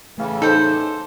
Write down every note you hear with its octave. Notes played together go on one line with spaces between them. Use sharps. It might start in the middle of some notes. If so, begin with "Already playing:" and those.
A2 C#3 E3 A3 F5
D#4 A4 C5